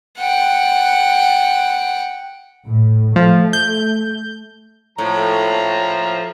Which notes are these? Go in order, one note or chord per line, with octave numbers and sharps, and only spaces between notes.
F#5 G5
A2
F3 A3
G6
A2 F3 A#5